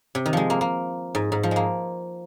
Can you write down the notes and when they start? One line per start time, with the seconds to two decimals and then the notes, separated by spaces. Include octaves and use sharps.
0.15 C3
0.26 D#3
0.33 F3 G#3
0.50 A#3
0.61 A#3
1.15 G#2
1.32 G#2
1.43 F3
1.51 G#3 A#3